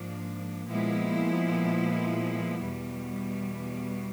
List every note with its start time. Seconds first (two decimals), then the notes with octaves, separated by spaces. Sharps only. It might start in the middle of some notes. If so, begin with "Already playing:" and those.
Already playing: G#2 F3 A#3 D4
0.67 A#2 F3 G#3 B3 E4
2.59 E2 B2 G3